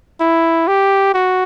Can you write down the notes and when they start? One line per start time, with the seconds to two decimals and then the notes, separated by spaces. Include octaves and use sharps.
0.20 E4
0.68 G4
1.14 F#4